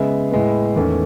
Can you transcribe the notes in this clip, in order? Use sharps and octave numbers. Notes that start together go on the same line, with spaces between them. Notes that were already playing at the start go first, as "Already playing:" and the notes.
Already playing: C#3 G#3 B3 E5
A2 G#3 B3
E2 D#3 A3 C#4